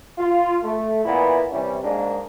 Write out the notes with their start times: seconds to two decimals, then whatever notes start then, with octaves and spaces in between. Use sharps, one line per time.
0.18 F4
0.63 A3
1.05 A#2 E3 B3 E4
1.51 C3 E3 G3 C#4 E4
1.84 G#2 G#3 A#3 D4